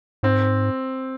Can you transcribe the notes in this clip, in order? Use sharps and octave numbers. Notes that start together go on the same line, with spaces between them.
G#2 C4